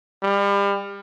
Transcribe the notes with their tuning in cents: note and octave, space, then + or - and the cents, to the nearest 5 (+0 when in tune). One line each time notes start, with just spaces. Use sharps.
G3 +35